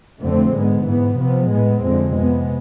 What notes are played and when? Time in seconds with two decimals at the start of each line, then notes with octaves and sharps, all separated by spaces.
0.21 F2 D3 A3 C4
0.53 G#2 G#3 B3
0.85 G#2 E3 B3
1.18 C3 F3 B3
1.50 A2 G#3 B3
1.82 F2 D3 G#3 C4
2.14 C3 G#3 B3